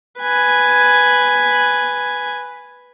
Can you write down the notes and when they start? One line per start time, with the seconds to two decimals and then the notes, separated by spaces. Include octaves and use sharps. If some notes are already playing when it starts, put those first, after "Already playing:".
0.19 B4 G#5